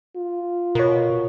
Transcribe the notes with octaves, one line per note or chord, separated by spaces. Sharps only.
F4
B2 A#4 C#5